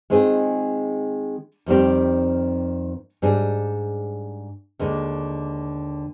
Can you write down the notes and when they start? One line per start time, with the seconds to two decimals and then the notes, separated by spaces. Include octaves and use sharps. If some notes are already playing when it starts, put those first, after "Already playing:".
0.10 D#3 G#3 C4 F4 G#4
1.66 F2 D#3 G3 C4 G4
3.22 G#2 G3 D4 G#4
4.79 D#2 D3 G#3